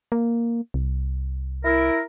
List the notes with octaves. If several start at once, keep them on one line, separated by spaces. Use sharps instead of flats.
A#3
C2
E4 A#4